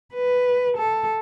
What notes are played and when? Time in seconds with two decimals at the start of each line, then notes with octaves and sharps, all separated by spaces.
0.14 B4
0.78 A4